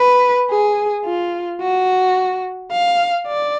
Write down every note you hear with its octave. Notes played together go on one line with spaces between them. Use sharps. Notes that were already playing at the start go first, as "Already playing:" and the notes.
Already playing: B4
G#4
F4
F#4
F5
D5